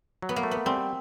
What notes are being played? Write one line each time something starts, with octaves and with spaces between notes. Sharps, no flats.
F#3
B3
A#3
A3
B3
G3 C4